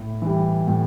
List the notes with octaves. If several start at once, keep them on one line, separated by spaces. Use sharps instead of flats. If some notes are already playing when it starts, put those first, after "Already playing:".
Already playing: A2
E3 G3
A2